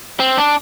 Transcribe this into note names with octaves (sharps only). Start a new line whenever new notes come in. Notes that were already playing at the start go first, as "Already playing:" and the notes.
C4
D4